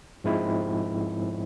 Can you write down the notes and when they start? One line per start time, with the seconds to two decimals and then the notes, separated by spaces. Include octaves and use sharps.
0.24 G#2 F3 G#3 C4 E4